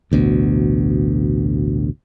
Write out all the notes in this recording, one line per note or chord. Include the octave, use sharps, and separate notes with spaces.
A1 D2 B2